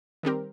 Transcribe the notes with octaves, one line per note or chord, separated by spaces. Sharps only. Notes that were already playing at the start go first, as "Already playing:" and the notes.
D#3 G3 C4 G4 A#4